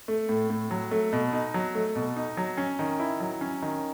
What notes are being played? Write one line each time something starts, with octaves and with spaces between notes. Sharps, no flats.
A3
A2
A2
F#3
A3
B2
D#4
F#3
A3
B2
D#4
F#3
C#4
D#3
E4
F#3
C#4
D#3